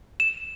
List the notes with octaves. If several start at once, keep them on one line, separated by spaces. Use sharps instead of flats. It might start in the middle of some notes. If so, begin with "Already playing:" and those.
E7